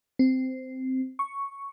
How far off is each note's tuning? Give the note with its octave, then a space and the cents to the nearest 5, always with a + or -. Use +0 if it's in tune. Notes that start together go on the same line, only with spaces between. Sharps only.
C4 -10
C#6 +0